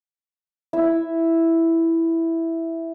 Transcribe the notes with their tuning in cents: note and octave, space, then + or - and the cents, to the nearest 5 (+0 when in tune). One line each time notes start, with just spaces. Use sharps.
E4 +0 E5 +0